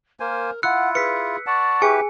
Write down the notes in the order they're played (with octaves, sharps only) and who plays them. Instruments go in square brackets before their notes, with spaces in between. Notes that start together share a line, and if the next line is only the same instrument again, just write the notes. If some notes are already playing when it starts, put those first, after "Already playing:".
[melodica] A#3 C5 G#5 [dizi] A#4
[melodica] E4 F4 [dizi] F#5 [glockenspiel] E6 F#6 C#7
[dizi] G#4 [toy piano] B4 [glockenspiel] B6 C#7
[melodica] D5 F#5 A5 [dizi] C#6
[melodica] E4 G4 B4 [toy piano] G#4 [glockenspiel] G#5 C#7